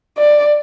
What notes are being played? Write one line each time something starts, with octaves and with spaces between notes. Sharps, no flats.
D5